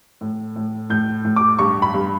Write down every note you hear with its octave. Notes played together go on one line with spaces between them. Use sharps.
A2
A2
A2 G6
A2
D6
G2 C#6
B5
G2